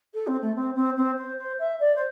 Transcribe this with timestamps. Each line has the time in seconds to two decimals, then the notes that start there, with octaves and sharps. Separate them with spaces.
0.14 A4
0.27 C4
0.41 A3
0.55 C4
0.75 C4
0.96 C4
1.17 C5
1.38 C5
1.59 E5
1.80 D5
1.95 C5